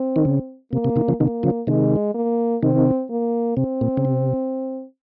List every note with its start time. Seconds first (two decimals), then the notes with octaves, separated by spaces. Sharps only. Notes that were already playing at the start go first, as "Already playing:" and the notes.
Already playing: C4
0.16 D#3
0.25 C#3
0.72 C3 A#3
0.85 C3
0.96 C3 D#3
1.08 C#3 F3
1.20 C3 D#3 A#3
1.43 C#3 F3
1.67 C3 D#3 G#3
2.14 A#3
2.63 C3 D#3 C4
3.10 A#3
3.57 C3 C4
3.81 A#2
3.97 C#3
4.05 C3